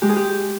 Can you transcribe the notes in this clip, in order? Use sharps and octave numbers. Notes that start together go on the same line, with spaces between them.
G#3 G4
G#4
G4